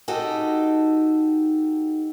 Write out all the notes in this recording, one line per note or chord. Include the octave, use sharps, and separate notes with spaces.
D#4 F#4 G4 A4